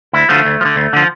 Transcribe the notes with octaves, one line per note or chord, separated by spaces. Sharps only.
D2 E4
D3 F3 A3
D2
F3
D3
D2
D3 F3